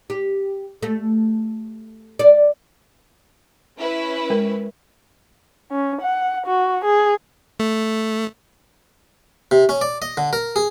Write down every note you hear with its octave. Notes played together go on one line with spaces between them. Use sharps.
G4
A3
D5
C#4 E4 B4
G#3 A#4
C#4
F#5
F#4
G#4
A3
C3
C#4
D5
D#5
D3
A#4
G#4